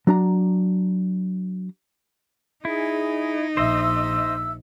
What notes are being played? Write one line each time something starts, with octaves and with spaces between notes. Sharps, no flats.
F#3 D4 A#5
D#4 E4 G#4
A#1 C5 D#5 E5 E6